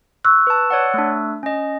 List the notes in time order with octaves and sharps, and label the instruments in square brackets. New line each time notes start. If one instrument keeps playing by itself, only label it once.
[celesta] C#6 E6 F#6
[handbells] B4 A5
C#5 D5 F#5
A3 D4
C#4 D#5